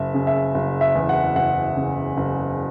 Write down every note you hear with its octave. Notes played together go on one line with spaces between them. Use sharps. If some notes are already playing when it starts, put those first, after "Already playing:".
Already playing: F#1 E5
C#3
E5
F#1
E5
E2
F#5
F#1 F#5
C#3
F#1